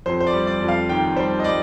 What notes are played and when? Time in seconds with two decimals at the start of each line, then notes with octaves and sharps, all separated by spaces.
0.06 F2 C5
0.21 C5
0.27 D5
0.34 G3
0.47 D5
0.61 F2
0.68 F5
0.89 D#3 G5
1.16 G3 C5
1.39 D#5
1.44 G3 D5